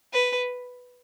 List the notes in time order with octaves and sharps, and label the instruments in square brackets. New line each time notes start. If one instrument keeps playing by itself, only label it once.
[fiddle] B4